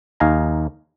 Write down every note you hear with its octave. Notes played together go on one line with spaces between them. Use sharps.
D#2 D#4 F5 G#5 A#5